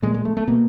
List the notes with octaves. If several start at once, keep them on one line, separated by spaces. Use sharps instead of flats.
A#2 G#3
G#3
A3
A3
B2 A#3